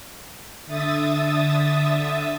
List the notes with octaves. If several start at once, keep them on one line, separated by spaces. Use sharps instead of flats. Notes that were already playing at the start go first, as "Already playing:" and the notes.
D3 E5 D#6 A6